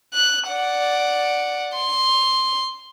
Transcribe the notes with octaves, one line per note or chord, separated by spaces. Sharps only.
F#6
D5 F#5
C6